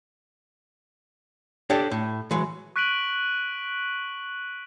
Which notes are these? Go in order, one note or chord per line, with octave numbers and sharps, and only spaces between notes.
D4 G4 A4 C#5 D5
A2
E3 F#3 G#3
C#6 F#6 B6 D7 D#7 F#7